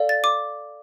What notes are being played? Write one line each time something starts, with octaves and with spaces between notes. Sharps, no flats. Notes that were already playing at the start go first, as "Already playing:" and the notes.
Already playing: A4 D5 F5
A6
D6